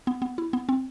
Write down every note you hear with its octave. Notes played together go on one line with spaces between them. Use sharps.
B3
B3
E4
B3
C4